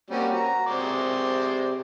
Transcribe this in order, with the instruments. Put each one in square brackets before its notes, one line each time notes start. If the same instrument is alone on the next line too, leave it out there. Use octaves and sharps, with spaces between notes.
[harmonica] G3 C#4 [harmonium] A#3 C4 F#4
[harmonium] F#4 [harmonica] A#5
[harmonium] C3 [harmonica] G#3 C5 D5